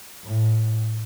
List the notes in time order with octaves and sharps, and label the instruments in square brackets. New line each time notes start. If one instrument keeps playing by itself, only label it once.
[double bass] A2